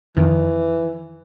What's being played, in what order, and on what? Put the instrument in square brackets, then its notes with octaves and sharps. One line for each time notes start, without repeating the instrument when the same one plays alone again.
[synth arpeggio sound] F2 D#3 [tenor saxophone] E3